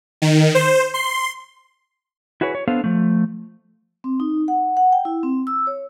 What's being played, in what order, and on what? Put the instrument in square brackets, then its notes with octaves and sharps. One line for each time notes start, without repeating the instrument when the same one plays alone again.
[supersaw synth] D#3
C5
C6
[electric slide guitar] E4 F#4 G#4 B4 C#5
C#5
B3 D4 A4 C5 F5
F3 A3
[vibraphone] C4
D#4
F#5
F#5
G5
E4
C4
E6
C#5